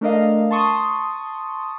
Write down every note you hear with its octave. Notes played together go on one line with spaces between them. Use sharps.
A3 D4 A#4 D#5 F5
A5 C6 C#6 D#6